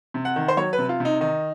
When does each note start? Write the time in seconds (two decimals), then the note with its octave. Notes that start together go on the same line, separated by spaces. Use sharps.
0.14 C3
0.25 F#5
0.36 D#3
0.48 C5
0.57 F#3 C#5
0.73 B4
0.78 C3
0.89 F4
1.00 C3 D#4
1.21 D#3 D#4